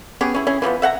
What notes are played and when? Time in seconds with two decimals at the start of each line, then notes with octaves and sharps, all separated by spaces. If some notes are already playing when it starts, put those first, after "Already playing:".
0.21 B3 C#4 G4 G#4
0.35 C#4 E4 G#4
0.47 C#4 E4 G#4 G#5
0.62 E3 F3 A#3 B3
0.82 E5 F#5 G5 A#5